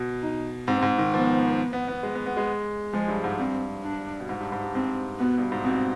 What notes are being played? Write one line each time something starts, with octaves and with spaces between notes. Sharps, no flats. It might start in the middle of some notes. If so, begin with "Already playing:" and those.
Already playing: B2
D#4
G#2 C4
G#2
D#3
F3 B3
B3
B3
G#3
B3
B3
G#3
F3 G#3
G2
G#2
G2 C4
D4
B2
G#2
G2
G#2
G2
G#2 C4
B2 B3
G2
G#2
B2 C4